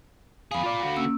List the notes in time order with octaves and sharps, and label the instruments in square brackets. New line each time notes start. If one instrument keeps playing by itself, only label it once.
[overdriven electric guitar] F2 G#4 [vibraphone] F5 B5
[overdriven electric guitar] F4 D5
D3 F#4
[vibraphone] A#3 C#4 E6